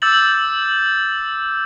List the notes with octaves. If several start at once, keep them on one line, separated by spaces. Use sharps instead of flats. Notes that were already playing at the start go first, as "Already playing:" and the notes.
D6 E6 G6 A6 F#7